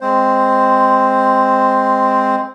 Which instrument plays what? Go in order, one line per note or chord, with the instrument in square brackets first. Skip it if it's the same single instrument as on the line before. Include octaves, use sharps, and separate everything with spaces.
[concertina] G#3 C4 C5